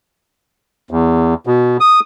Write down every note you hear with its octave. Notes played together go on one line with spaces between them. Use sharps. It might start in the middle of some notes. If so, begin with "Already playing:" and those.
E2
B2
D#6